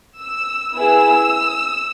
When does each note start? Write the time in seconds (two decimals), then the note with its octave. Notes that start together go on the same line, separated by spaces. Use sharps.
0.21 E6
0.75 B3 E4 G#4 E6